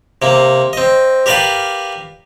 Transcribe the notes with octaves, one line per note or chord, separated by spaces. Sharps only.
C3 A#3
C4 D#5
G4 A#4 B4 D5 F5 G5